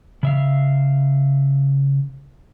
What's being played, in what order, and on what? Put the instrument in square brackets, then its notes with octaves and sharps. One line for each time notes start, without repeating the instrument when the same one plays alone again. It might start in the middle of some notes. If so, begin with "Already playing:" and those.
[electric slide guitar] C#3 E5 F5